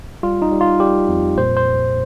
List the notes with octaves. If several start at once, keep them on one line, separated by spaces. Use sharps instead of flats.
G3 F4
D#4
G3
F4
G3 G4
F2
A#2 C5
C5
C2